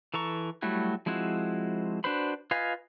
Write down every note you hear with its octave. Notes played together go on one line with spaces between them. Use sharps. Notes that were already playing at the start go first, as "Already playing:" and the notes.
E3 A4 A#5 C#6
F#3 G3 A3 E4 F#4
F3 G#3 C4 E4 F#4
D4 F#4 B4 C5 B5
F4 B4 D#5 F5 G#5